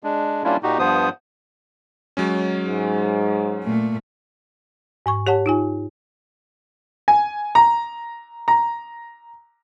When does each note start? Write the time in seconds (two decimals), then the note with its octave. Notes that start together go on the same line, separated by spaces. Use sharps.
0.03 G#3 D4
0.44 G3 A#3 C#4 D4 E4 F4
0.63 A#2 D#4 F#4 G4
0.79 G2 F3 B3 C5 D#6
2.17 F#3 G#3 C#4
2.64 G#2
3.64 A#2 A3
5.06 G#2 G#5 C#6
5.27 G4 C#5 F#5 A5
5.46 D#4 F4 G#5
7.08 G#5
7.55 A#5
8.48 A#5